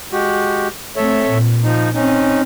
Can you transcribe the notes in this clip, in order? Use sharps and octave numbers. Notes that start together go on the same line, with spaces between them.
G#3 F#4 G4
A3 C4 A4 C#5 E5
A#2
F3 D#4
C4 C#4 D#4